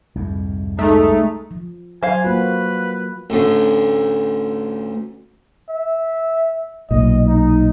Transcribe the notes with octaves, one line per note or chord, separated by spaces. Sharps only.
C2 F2 G#2
G#3 A3 D#4
F3
F#3 C5 F5 G#5
A#3 F4 F#4 B4
A1 D2
E5
B1 A#2 D#5
D#4